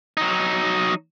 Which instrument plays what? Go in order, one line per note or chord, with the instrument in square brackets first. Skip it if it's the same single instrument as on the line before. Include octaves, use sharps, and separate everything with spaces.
[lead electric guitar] F#3 D#4